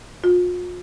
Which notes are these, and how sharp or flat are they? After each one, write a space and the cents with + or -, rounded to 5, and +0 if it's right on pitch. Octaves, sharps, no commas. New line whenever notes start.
F4 +40